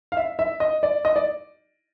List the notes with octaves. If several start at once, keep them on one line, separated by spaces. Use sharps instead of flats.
F5
E5
E5
D#5
D5
D#5
D5